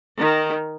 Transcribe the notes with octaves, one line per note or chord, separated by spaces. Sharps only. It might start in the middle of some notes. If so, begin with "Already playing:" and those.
D#3